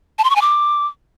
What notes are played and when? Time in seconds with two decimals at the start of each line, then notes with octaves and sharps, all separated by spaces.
0.18 A5
0.24 C6
0.30 C#6
0.36 G#5
0.41 D6